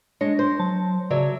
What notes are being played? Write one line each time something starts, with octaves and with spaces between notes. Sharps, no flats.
G#3 D4 C#5 A#6
C5
F#3 A5
C#3 F#3 C#5 D5 E5